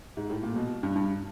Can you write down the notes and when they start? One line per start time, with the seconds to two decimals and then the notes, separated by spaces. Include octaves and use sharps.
0.17 G#2
0.30 A2
0.43 A#2
0.56 B2
0.83 G2
0.96 G2